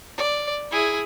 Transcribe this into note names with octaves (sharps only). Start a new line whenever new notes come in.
D5
E4 G#4